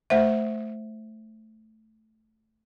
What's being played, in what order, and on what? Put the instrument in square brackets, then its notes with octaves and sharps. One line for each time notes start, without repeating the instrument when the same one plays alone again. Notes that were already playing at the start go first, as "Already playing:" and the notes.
[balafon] A3 C5 E5